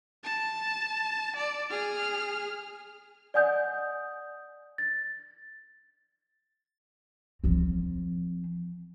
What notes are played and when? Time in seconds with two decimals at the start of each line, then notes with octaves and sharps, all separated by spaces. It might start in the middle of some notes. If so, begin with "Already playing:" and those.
0.23 A5
1.36 D5
1.70 G#4 F6
3.34 D5 D#5 F#5 G#5 D#6 G6
4.78 A6
7.44 F3 C4